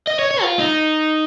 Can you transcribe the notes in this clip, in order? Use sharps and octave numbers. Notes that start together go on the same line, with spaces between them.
D#5
C#5
C#5
F4
D#4